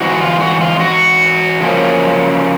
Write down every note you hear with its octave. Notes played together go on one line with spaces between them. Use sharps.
G#2 E3 F#4
F4
F#4
F4
F#4
C#3 F3 A#3 C#4